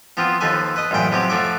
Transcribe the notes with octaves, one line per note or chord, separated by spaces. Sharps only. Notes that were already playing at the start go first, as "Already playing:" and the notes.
F3 B3 C4 F4
D#2 F3 A4 B4 G#5
B4 D#5
A1 F#2 A#2 G5 B5
C3 F3 F#3 G4
F3 A3 F#4 D6